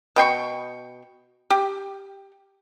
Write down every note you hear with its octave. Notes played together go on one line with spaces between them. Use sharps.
B2 G5 C6 C#6
G4